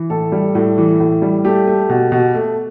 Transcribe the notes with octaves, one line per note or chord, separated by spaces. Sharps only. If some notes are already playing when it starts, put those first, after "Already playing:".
Already playing: E3
A2 A4
G3
A2
E3
A2
G3
A3 G4
A3
B2
B2
A3